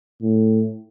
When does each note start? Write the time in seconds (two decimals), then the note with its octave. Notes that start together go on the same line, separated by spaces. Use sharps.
0.23 A2